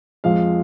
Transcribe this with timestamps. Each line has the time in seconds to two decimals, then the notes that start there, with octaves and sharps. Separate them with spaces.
0.24 F2 F3 G#3 F5